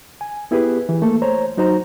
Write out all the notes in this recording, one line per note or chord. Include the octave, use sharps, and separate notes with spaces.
G#5
B3 E4 G4 G#4 B4
E3
A3 A#3 A4
C5 C#5 A#5
F#3 D#4 F#4 C5 A#5